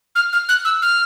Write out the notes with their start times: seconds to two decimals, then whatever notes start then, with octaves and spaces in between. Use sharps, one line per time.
0.15 F6
0.33 F6
0.49 F#6
0.65 E6
0.82 F6